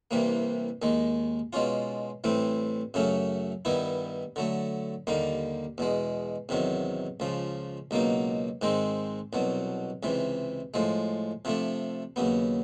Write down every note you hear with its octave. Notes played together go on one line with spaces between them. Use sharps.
C2 C3 E3 G3 A#3
D#2 D#3 G#3
B2 G#3 C#4 F4
A2 E3 G3 C4
F#2 C#3 F#3 A3 C#4
G2 D#3 G3 B3 E4
D3 F#3 A3
D#2 D3 G3 A#3 D#4
E2 B2 G#3
E2 C3 D#3 F#3
C#2 C#3 F3
C#2 B2 F#3 A#3 D#4
G#2 D#3 G#3 C4
C2 B2 F#3
C#2 C3 E3
A2 F3 G#3
C3 F3 A3 D4
D#2 C#3 F#3 B3